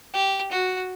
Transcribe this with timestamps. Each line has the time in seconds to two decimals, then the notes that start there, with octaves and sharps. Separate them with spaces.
0.14 G4
0.52 F#4